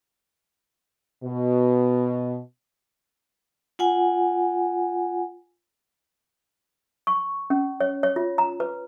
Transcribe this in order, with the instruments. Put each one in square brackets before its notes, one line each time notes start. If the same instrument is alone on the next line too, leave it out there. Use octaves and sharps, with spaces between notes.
[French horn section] B2
[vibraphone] F4 F#5 G#5
[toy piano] C#6
C#4
C#5
C#5
F4
A#5
B4